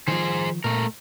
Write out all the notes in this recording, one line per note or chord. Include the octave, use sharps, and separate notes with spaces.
D#3 F3 G#4 C5
A#2 A3 A#4